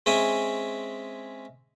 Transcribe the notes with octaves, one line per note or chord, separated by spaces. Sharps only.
G#3 C4 C#4 E5 G5 G#5